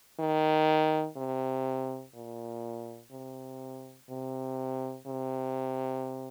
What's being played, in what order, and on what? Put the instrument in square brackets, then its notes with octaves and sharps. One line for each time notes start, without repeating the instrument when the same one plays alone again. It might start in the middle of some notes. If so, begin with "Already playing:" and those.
[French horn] D#3
C3
A#2
C3
C3
C3